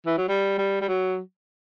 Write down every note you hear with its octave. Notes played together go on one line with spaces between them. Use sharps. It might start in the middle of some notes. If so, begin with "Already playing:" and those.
E3
F#3
G3
G3
G3
F#3